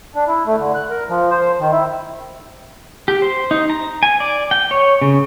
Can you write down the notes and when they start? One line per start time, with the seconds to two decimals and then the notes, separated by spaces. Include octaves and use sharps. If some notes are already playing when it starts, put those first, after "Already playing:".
0.15 D4
0.28 E4
0.46 A3
0.58 D3
0.75 F#6
0.90 A#4
1.09 F3
1.31 C5
1.59 D#3
1.72 E4
3.08 G4
3.22 C5
3.51 D#4
3.70 A#5
4.03 G#5
4.20 D5
4.51 G5
4.71 C#5
5.02 C#3